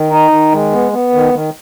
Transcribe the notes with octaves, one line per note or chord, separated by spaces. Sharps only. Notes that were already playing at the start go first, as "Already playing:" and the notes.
Already playing: D#3
D#4
D#3
G#3
B3
B3
D#3
D#3